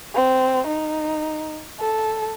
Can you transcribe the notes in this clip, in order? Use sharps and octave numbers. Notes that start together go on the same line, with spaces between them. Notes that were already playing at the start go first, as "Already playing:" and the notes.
C4
D#4
A4